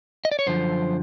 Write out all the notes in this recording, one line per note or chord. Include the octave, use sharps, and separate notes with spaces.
D#5
D5
C#5
F#2 D3 F3 C5